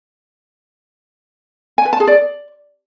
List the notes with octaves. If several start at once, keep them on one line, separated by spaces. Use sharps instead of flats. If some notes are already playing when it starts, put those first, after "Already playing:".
G#5
B4
A5
G#4
D5